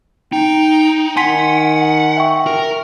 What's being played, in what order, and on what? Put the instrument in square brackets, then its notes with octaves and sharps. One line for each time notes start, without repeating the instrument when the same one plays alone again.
[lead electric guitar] D#4 [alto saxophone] G5
[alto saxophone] D#3 [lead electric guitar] F#5 [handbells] G#5 C6 B6
[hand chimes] E5 G5 C#6
[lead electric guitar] A#4